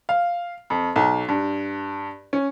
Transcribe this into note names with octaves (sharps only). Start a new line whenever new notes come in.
F5
F2
B1
G2
C#4